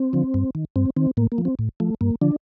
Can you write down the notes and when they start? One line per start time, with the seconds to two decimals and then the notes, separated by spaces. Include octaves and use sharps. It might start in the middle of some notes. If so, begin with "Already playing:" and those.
Already playing: C4
0.13 D3 F3
0.34 G2
0.55 D#3
0.76 G2 C4
0.97 D#3 C4
1.17 A2 A#3
1.32 A#3
1.38 F3
1.45 C4
1.59 A2
1.80 F3 A3
2.01 G2 A#3
2.22 D3 F3 D4